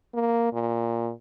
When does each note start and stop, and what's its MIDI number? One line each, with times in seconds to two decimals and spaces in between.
0.14 0.52 58
0.53 1.11 46